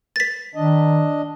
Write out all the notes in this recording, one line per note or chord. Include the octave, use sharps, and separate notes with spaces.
A6 B6
D#3 D4 D#5